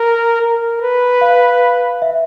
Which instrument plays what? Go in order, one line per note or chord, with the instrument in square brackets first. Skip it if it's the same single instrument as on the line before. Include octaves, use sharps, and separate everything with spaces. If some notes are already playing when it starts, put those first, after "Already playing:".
Already playing: [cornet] A#4
A#4
B4
[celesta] F5
E5